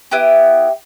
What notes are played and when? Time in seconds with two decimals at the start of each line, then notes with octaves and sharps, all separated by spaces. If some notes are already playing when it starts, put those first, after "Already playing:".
0.11 B3 E4 G4